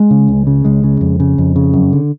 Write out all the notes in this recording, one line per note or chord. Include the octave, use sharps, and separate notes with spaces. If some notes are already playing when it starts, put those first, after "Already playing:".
Already playing: G#3
C#3
C#2
C#3
C#2 G#3
C#3
F2
C#3
F2
C#3
F#2
D3